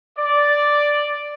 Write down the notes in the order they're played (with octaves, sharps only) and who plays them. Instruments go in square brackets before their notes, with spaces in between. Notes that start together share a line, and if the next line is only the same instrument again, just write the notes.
[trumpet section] D5